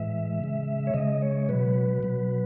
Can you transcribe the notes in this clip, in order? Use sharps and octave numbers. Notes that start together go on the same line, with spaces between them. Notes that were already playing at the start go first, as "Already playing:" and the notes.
Already playing: A2 E3 G#3 E5
C#3 G#3
C#5
C#3 G#3 D#5
C#5
B2 F#3 B4
B2 F#3